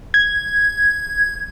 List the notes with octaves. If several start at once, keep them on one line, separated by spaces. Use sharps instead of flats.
G#6